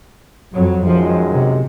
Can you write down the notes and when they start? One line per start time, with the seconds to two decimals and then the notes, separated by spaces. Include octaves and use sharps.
0.53 F2 F#3
0.85 F#2 D#3 F3 G#3
1.32 C3